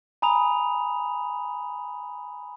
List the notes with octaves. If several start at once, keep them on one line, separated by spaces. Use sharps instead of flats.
G#5 A#5 B5 D#6 F7